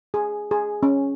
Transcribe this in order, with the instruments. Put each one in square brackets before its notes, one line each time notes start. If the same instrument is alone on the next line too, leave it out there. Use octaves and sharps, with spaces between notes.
[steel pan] G#4
G#4
C#4